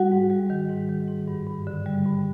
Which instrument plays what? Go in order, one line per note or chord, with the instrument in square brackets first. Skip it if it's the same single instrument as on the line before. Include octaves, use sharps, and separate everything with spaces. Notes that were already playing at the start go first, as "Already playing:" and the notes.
Already playing: [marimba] G3 F#4 F#5
G#2
G3
D#3
G#2
D#3
G#2
G2
G2
D3
G3
G2